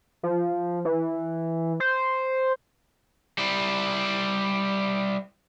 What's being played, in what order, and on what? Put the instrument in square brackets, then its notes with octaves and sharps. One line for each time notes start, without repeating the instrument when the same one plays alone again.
[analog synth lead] F3
E3
C5
[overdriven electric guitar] G3 E4